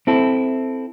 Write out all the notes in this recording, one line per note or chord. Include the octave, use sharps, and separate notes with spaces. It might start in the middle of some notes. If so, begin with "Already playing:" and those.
C4 E4 A4